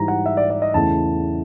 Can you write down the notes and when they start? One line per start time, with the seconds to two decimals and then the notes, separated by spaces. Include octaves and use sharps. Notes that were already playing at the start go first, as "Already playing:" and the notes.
Already playing: G#2 E3 G3 A#5
0.08 F#5
0.26 E5
0.37 D5
0.50 D5
0.62 D#5
0.74 E2 C#3 E3 A3 A5